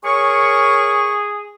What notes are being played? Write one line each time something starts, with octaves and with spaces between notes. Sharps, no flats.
G#4 A#4 C#5 C#6